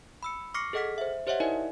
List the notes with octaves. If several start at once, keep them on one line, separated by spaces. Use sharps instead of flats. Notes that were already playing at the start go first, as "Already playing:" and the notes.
B5 E6 C#7
C#6 D6 F6 A#6 C7 C#7
G#4 A4 D#5 F#5 F6 B6
C5 E5
G4 C5 C#5 D#5 E5 F#5
D#4 E4 A#4 D5 D#5 G#5